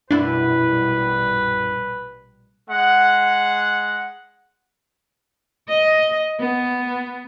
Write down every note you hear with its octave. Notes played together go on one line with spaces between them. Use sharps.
A#1 F#2 B2 G3 D4 E4 B4
G#3 F#5
D#5
B3